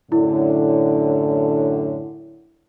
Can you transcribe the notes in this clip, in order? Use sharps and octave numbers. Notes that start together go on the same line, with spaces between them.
F#2 A2 D3 E4